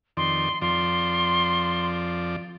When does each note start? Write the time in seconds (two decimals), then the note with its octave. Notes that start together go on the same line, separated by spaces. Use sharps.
0.17 F2 D#3 D5 C6
0.62 F2 F3 D5 C6